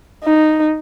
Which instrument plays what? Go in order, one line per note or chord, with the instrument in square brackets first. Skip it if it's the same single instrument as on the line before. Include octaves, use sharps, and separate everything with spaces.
[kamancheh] D#4